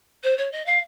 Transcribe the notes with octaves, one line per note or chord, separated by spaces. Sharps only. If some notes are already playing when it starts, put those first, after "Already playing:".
C5
C#5
D#5
F5